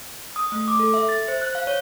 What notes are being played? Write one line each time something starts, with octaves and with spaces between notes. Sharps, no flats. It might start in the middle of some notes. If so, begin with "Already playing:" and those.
D#6
A3
D6
A4
E5
A6
C5
F#6
F5
C#5